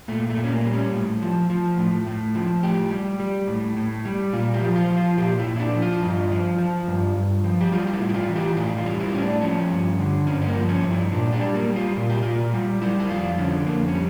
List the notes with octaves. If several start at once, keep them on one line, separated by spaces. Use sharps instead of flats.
A#2 A3
A3
A#2
C#4
A#3
G3
C#4
A2
F3
F3
A2
A2
F3
A2 G4
G3
G3
A2
A2
G3
A#2 F4
G4
F3
F4
F3
F4
A#2 G4
E4
A#2
E4
D4
F3
F4
G2
F3
F3
G2
G2
F3
G4
G3 F4
F4
E4
A2
E4
F4
E3
G4
A2 F4
F4
G3
E4
A2 C#4
D4
F3 C#4
G2
D3
G2 C#4
C#4
A#3
F3
C#4
G2
E4
A#2 D4
D4
G3
A#3
G3
F4
A#2 F4
G4
A#2 F4
G3
G3 E4
E4
F2 F4
D3 C#4
F2 A#3
C#4
G3